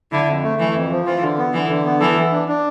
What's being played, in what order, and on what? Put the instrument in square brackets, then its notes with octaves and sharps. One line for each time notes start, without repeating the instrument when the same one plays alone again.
[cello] D3 [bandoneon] E4
[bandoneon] F2
A3
[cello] E3 [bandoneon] A3
[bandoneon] F2
F3
[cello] E3 [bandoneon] F4
[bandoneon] D3
B3
[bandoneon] D3 [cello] E3
[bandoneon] D3
B3
[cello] E3 [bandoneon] A4
[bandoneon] E3
D4
D4